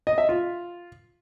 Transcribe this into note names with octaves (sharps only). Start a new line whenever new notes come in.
D#5
E5
F4